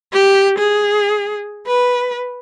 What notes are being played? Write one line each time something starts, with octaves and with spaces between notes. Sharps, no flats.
G4
G#4
B4